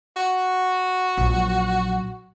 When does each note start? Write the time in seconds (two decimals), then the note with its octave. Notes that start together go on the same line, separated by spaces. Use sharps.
0.16 F#4
1.18 A#1 F#3